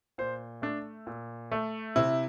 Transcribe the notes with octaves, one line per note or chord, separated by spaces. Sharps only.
A#2 C5
A3 D4
A#2
A3
C3 E4